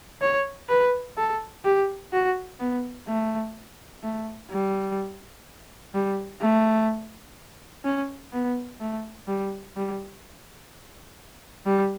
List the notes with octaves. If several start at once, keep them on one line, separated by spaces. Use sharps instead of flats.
C#5
B4
A4
G4
F#4
B3
A3
A3
G3
G3
A3
C#4
B3
A3
G3
G3
G3